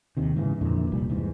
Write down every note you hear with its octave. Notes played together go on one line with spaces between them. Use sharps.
D#2 C3 D#3
G#2 C#3 E3
F2 A#2 D3 E3
F1 C2 A#2 G3
E2 G#2